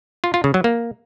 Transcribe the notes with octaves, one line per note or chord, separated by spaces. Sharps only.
F4
F4
C#3
F#3
A#3